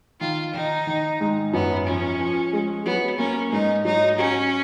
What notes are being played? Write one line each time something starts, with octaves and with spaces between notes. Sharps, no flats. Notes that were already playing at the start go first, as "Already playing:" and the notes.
D#3 F4
D#3 D#4
D#3
G#2
F#2 B3
F3 C#4
F3
G#3
F#3 B3
A#3 C#4
G#2 D#4
F#3 D#4
C#4 F#4